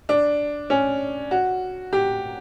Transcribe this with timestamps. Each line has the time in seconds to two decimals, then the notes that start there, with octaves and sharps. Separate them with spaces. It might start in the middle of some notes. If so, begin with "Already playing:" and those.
0.09 D4
0.70 C#4
1.31 F#4
1.93 G4